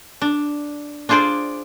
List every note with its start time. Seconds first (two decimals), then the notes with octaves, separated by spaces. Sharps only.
0.22 D4
1.09 D4 F4 G#4 C5 D5